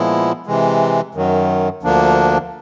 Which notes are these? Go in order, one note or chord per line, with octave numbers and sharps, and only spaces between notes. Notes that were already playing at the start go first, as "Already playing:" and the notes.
Already playing: A#2 F3 G#3 B3 E4
C3 E3 G#3
F#2 D#3 F#3
D2 D3 F3 A#3 D4